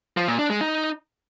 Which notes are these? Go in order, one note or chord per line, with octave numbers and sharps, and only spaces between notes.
F3
A#2
D4
G#3
D#4